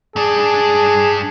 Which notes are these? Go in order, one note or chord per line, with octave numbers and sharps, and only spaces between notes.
G2 D4 G#4